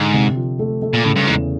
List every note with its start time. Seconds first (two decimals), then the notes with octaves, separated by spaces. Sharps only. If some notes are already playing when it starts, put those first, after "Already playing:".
Already playing: G#2 D3
0.14 C3
0.36 F3
0.59 A3
0.82 A3
0.93 A#2
1.04 A2 C#3
1.16 G2
1.27 E2 G#2